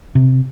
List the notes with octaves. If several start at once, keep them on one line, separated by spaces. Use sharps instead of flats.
C3